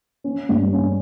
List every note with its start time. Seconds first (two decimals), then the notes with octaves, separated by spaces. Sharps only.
0.24 C#4
0.49 G2
0.73 C#4